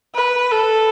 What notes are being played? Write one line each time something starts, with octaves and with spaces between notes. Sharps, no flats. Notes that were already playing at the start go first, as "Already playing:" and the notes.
B4
A4